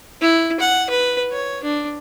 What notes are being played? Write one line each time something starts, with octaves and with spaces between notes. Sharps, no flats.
E4
F#5
B4
C#5
D4